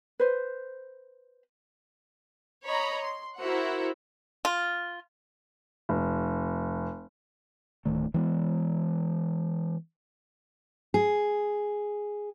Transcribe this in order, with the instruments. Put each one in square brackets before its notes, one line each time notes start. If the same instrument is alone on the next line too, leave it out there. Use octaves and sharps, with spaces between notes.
[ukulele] B4 C5
[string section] C#5 D#5 A#5 B5
C6
E4 F#4 A#4 C5 E5 F#5
[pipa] F4
[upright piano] F1
[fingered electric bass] D1 D#3 A3
E3 G#3 B3
[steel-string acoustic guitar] G#4